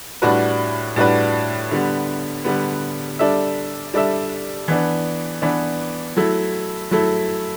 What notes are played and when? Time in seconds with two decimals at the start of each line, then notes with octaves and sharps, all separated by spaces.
0.22 A2 G3 D4 F#4 B4
0.96 A2 G3 D4 F#4 B4
1.71 D3 G3 B3
2.45 D3 G3 B3
3.19 G3 D4 A4 E5
3.94 G3 D4 A4 E5
4.68 E3 B3 D4
5.42 E3 B3 D4
6.17 F#3 A3 E4 A4
6.91 F#3 A3 E4 A4